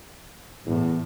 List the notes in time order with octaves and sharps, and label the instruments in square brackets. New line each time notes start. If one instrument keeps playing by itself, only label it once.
[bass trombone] E2 [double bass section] A2